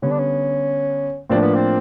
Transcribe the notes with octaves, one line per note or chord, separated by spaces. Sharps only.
D3 G3 B3 C#4
D4
C#4
A2 F3 A#3 C4 D4
B3
C4